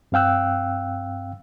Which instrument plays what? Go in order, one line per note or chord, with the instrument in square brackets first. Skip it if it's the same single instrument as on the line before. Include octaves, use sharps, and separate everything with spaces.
[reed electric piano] G2 C4 F5 G5 E6 F#6